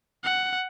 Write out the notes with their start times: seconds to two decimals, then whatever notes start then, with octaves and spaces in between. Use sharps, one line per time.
0.24 F#5